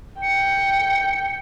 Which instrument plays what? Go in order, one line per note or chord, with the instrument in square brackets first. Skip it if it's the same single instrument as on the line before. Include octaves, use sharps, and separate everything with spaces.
[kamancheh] G5 [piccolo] C#7